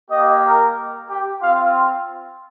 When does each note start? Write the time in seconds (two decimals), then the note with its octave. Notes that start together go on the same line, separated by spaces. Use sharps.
0.10 A#3 G4 D#5
0.44 A#4
1.09 G4
1.42 C4 F4 F5